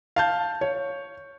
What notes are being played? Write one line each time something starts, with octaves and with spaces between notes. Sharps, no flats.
F5 A5 G6
C#5